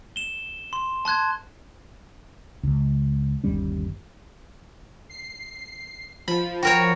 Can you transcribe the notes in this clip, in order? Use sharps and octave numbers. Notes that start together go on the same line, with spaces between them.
E7 G7
C6
A5 C6 F#6 G#6
C#2
G1 D#2 G3 C#4
C7
F3 B5
F3 F#4 A#4 C#5 G5